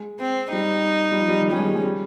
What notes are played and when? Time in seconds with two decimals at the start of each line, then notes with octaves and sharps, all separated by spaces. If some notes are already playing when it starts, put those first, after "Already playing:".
Already playing: G#3
0.20 C4
0.53 G3 D#4
1.12 G3
1.18 F3
1.28 G3
1.40 D#3
1.51 G3 C#4
1.59 G#3
1.67 G3
1.75 G#3
1.84 G3